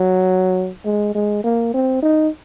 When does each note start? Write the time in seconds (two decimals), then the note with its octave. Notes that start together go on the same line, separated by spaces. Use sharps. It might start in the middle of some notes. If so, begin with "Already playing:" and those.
Already playing: F#3
0.85 G#3
1.15 G#3
1.44 A#3
1.74 C4
2.02 D#4